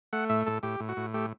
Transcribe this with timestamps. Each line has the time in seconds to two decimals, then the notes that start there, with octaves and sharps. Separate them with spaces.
0.13 A3 F#5
0.29 A2 E5
0.46 A2 A4
0.63 A2 G4
0.80 A2
0.89 F#4
0.97 A2
1.14 A3 G4